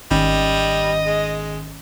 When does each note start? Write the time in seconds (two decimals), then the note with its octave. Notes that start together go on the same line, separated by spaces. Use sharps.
0.11 G#1 D#3 G3 C#4 D#5
1.06 G#3